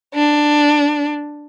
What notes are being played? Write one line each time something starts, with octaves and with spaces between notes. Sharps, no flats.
D4